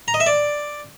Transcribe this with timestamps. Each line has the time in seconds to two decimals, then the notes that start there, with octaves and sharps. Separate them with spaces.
0.08 A#5
0.14 D#5
0.20 E5
0.26 D5